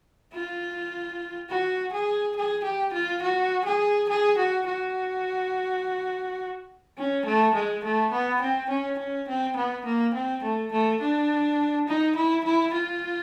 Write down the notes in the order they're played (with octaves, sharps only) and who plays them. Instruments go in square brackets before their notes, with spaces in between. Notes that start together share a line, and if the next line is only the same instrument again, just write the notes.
[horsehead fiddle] F4
F#4
G#4
G#4
G4
F4
F#4
G#4
G#4
F#4
F#4
C#4
A3
G#3
A3
B3
C4
C#4
C#4
C4
B3
A#3
C4
A3
A3
D4
D#4
E4
E4
F4